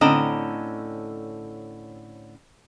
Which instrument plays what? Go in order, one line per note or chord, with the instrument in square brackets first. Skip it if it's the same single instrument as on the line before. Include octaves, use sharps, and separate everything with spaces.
[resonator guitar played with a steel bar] A2 D3 C4 C#4 D#5 A#5